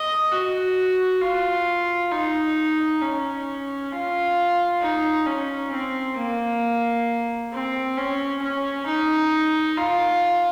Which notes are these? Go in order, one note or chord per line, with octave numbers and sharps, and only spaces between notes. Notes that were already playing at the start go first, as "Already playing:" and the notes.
Already playing: D#5
F#4
F4
D#4
C#4
F4
D#4
C#4
C4
A#3
C4
C#4
C#4
D#4
F4